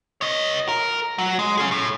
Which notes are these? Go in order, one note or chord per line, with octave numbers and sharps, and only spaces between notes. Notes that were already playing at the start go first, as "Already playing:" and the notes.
C#5 D#5
A#4
F#3
G#3
C#4 G#4
A2